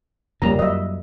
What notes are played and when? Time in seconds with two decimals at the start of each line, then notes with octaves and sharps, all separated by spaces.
0.42 F2 C#3 G3 A#3 A#5
0.59 F#2 D#5 E5